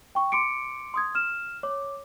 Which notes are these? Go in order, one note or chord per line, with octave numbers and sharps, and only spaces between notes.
G5 C#6
C6 D6 C#7 D7
C6 D#6 G#6
F6 E7
C#5 D6